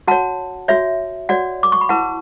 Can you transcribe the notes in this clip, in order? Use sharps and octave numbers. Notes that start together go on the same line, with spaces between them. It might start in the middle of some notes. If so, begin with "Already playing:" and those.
F#4 C#5 F#5 A5
F#4 C#5 E5
F#4 C#5 D5 F#5
D6
C#6
B5
E4 B4 F#5 A5